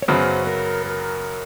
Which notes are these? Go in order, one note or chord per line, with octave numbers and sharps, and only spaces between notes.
C#5
F#2 C#3 F#3 B3 C5
A#4
A#4